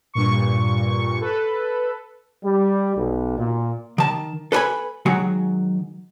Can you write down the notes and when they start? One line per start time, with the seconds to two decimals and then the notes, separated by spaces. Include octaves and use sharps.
0.14 G2 A#2 C#6
1.21 A4 B4
2.44 G3
2.97 B1
3.38 A#2
3.98 D#3 A5
4.52 A4 B4 C#5 G#5 B5
5.06 D#3 F#3 G#3 F#4